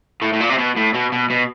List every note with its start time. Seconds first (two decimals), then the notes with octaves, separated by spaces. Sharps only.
0.22 A2
0.33 A2
0.40 A#2
0.50 C3
0.58 B2
0.77 A2
0.94 B2
1.12 B2
1.30 B2